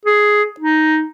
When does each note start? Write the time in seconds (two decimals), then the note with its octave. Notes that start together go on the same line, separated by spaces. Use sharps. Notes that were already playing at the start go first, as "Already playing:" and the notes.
0.05 G#4
0.60 D#4